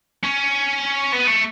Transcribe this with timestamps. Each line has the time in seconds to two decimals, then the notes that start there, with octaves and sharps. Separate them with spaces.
0.23 C#4
1.13 B3
1.27 A3